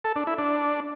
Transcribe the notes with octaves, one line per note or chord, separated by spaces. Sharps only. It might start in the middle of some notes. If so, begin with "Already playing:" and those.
A4
D4
E4
D4